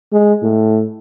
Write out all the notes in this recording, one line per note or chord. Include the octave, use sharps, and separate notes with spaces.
G#3
A2